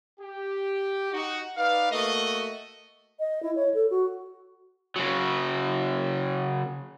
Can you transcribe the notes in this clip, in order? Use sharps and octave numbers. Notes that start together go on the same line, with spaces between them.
G4
D#4 F#4
D#4 B4 D5 F5
A3 A#3 F#4 D#5
D#5
E4
C#5
A4
F#4
C#3 F#3